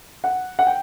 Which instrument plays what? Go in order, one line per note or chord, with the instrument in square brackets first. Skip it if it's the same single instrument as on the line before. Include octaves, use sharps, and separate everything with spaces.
[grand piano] F#5
F#5
G5